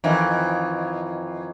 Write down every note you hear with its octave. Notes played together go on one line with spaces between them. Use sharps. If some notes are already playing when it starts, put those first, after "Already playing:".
F2 D#3 E3